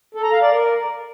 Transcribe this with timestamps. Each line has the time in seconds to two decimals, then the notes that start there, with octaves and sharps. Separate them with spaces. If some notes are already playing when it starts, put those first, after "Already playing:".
0.15 A4
0.24 A#5
0.33 F5
0.42 D5
0.51 A#4